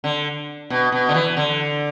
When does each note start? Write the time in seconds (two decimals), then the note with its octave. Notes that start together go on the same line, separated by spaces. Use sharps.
0.04 D3
0.70 B2
0.92 B2
1.09 D3
1.14 E3
1.37 D3